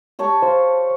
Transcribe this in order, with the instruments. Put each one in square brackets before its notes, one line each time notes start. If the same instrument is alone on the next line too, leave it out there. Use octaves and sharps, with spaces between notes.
[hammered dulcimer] G4 C#5 A5
[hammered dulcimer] F4 [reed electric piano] C5